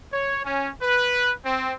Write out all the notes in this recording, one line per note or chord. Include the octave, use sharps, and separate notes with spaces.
C#5
C#4
B4
C4